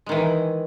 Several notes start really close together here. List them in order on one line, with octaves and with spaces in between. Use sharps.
G#3 D#3 E3